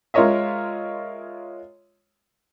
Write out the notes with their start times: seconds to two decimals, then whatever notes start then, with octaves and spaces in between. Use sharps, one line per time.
0.14 G#3 F4 A#4 C#5 D#5 E5